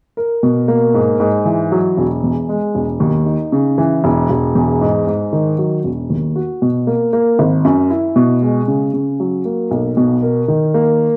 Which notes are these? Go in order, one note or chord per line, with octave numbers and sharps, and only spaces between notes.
A#4
B2
A#3
G#2
G#2
E3
F#3
E1
E2
G#3
E1
D#2
D#4
C#3
E3
E1
E1
E2
G#2
G#2
D#3
F#3
E1
D#2
F#4
B2
A#3
A#3
G#1
F#2
E4
B2
G#3
C#3
C#3
F#3
A#3
B1
B2
A#4
D#3
A#3